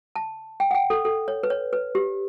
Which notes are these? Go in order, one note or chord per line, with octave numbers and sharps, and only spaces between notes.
A5
G5
F#5
G5
A4
A4
C#5
B4
C#5
B4
G4